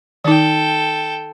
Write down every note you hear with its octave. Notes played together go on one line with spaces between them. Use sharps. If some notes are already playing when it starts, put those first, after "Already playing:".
D#3 D#4 A4 G5